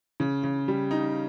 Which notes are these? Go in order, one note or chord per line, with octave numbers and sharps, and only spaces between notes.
C#3
C#3
G3
D#4